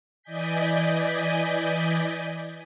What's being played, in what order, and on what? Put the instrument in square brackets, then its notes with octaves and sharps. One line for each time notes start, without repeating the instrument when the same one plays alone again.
[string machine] E3 D5 D#5 G#5 G6 B6